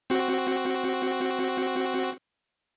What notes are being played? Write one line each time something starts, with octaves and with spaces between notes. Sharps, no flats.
C4 F#4